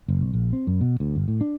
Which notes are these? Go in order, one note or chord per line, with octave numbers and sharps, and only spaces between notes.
F#1
B1
A#1
C4
F#2
B2
D2
G1
A2
D4